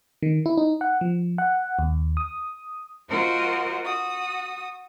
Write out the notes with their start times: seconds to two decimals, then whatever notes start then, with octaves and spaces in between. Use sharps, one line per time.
0.23 D#3
0.46 E4
0.57 D#4
0.81 F#5
1.01 F3
1.38 F#5
1.79 D#2
2.17 D#6
3.09 F4 F#4 A#4 C5 D#5 F#5
3.85 F#4 D#6